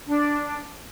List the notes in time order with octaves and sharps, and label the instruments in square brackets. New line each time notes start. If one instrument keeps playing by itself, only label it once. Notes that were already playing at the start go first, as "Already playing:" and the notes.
[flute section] D4